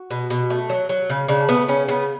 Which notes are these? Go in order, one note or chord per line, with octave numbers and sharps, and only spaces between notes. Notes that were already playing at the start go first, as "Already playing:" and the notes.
Already playing: F#4
B2
B2
A3
F#3
F#3
C#3
C#3 D4
A3 B3
C#3 C#4
C#3 B3